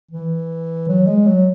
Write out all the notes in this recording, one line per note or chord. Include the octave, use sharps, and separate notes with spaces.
E3
F#3
G#3
F#3